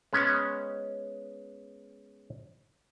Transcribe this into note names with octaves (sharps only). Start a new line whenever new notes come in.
G#3 B3 C#4